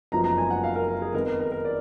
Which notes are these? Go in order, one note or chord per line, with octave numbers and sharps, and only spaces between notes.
F#1 F#2 F3 G#3 B3 A#5
A#5
G#5
F#5
F5
A#4
A#4
G#4
F2 D#3 G#3 B3 A#4
A#4
A#4
A#4
D5